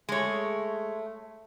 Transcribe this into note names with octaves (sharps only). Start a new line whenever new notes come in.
G#3 A3 C#5